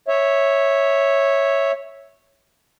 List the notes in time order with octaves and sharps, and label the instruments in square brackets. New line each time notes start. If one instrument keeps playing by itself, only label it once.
[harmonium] C#5 E5